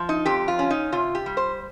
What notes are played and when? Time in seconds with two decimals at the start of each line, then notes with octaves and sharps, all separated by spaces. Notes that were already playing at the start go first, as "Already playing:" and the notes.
Already playing: F3
0.09 D#4
0.26 F2 G4
0.48 F4
0.59 C#4
0.70 D#4
0.92 C3 F4
1.15 G4
1.26 G3
1.37 C5